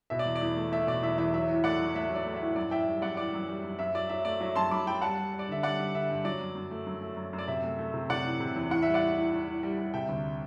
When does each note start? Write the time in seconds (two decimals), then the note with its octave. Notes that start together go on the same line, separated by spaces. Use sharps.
0.10 B2 E5
0.19 D5
0.26 E2
0.36 D5
0.42 E2
0.57 A3
0.72 A3 E5
0.87 B2 D5
1.02 E2 E5
1.18 E2 E5
1.34 F#3 E5
1.50 A2
1.64 A3 D5 F#5
1.79 F#3
1.95 A3 E5
2.10 F#3
2.16 D5
2.26 A3
2.36 E5
2.42 A2
2.56 F#2 D5
2.71 E3 E5 G5
2.88 G3
3.02 F#2 D5 F#5
3.17 E3 D5
3.34 F#2
3.48 G3
3.64 F#2
3.79 F#2 E5
3.95 F#3 D5
4.09 F#3 E5
4.25 A3 D5
4.41 F#3 E5
4.56 F#2 A5 C6
4.71 F#2 B5 D6
4.86 F#3 G5 B5
5.02 G3 F#5 A5
5.18 G3
5.33 G3
5.39 D5
5.49 D3 E5
5.63 G3 D5 F#5
5.80 G3
5.94 D3 E5
6.10 G2
6.25 F#3 D5
6.41 F#2
6.55 F#2
6.71 A3
6.86 F#2
7.02 A3
7.17 F#2
7.33 F#2
7.39 D5
7.48 C3 E5
7.64 A3
7.79 A3
7.94 C3
8.10 C3 D5 F#5
8.24 E3
8.40 C3
8.56 E2
8.70 A2 F#5
8.82 G3 E5
8.94 D5 F#5
9.01 A2
9.17 A2
9.32 A2
9.47 A2
9.63 G3
9.79 G3
9.94 C3 E5 G5
10.09 D2